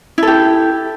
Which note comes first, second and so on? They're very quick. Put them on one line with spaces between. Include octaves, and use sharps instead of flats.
E4 A4 G4